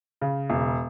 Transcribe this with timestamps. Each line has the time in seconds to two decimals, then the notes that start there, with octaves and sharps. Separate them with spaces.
0.21 C#3
0.50 E1